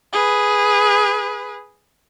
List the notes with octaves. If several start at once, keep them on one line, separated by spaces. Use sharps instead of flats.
G#4 B4